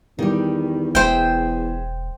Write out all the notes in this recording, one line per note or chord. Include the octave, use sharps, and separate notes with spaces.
E2 D#3 G3
E1 G#4 C5 E5 G5